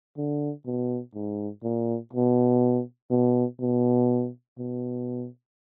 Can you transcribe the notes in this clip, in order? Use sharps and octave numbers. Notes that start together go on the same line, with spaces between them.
D3
B2
G#2
A#2
B2
B2
B2
B2